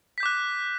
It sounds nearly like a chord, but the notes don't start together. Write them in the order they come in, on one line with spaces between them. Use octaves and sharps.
B6 G6 D6 F#6